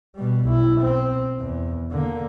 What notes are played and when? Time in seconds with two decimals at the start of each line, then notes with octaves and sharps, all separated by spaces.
0.15 B2 G3
0.45 B1 E4
0.81 C4
1.39 E2
1.91 D3 A#3